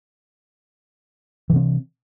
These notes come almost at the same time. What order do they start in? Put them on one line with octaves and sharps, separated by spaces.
E3 C3 C4